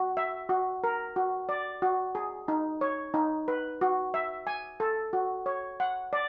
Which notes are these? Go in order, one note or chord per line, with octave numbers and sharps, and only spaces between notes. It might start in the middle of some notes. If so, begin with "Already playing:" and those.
Already playing: F#4
E5
F#4
A#4
F#4
D5
F#4
G#4
D#4
C#5
D#4
B4
F#4
E5
G#5
A4
F#4
C#5
F#5
D5